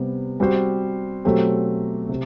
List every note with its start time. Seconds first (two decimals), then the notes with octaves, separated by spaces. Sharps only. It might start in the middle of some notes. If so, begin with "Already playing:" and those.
Already playing: C3 G3 B3
0.40 G3 C4 F#4 C5
1.25 B2 F#3 A3 C4 G4
2.09 C3